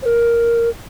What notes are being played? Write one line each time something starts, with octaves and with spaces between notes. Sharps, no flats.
C5
A#4